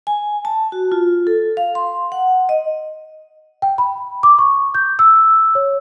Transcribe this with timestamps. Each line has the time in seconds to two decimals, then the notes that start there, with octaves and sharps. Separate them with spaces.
0.07 G#5
0.45 A5
0.72 F#4
0.92 F4
1.27 A4
1.57 F5
1.75 C6
2.12 F#5
2.49 D#5
3.62 G5
3.78 B5
4.23 D6
4.39 C#6
4.74 G6
4.99 E6
5.55 C#5